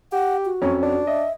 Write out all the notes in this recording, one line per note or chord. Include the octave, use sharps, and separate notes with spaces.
G4 F#5
F#4
F2 F#3 C#4
D4
D#5 E5